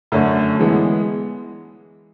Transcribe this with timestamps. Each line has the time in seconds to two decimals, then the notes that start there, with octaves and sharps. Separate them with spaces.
0.12 F#2 D3 A3 C#4
0.59 E3 G#3 B3